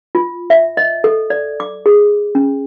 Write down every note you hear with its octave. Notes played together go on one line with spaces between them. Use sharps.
F4
E5
D#5
A4
D5
D6
G#4
C#4